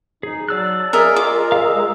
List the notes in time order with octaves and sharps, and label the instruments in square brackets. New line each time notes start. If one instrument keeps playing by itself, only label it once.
[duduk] D#4 [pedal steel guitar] G#4
[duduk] F#3 [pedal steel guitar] D5 E6 F#6 [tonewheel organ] A5
[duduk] G#4 [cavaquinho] A#4 D#5 E5
[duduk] F4 [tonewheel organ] G#4 A#4 D#5 [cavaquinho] D6
[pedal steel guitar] F5 E6
[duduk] G#3